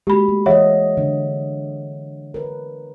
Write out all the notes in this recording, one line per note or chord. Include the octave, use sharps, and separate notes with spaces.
G#3 A#3 F#4 G4 B5
A3
E3 G#4 C#5 D#5 E5 F#5
D3 D4
A#4 B4